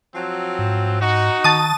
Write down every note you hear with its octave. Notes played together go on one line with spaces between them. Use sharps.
F3 F#3 C4
G#2
D#4 F#4
D#3 A5 D#6